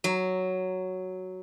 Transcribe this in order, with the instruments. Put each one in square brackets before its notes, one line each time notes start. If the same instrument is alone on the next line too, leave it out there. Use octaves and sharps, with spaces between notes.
[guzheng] F#3